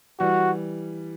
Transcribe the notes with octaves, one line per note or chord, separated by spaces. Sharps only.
E3 G3 F#4